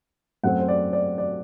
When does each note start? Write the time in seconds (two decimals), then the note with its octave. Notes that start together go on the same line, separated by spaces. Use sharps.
0.43 F#2 F#3 A3 C4 F#5
0.60 C5
0.68 D5
0.93 D5
1.18 D5